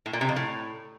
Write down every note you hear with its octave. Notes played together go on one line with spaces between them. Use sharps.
A2
A#2
C3
F2
A2